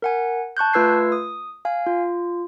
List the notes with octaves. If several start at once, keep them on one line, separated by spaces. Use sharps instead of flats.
A#4 F#5 G#5
A5 C#6 F#6 G6
A3 F4 B4 E6 G#6 C7
D#6
F5 G#5
F4